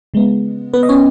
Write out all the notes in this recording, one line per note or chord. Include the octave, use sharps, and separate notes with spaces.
C#3 G#3 B3
B3 B4
D#5
C#4 C#5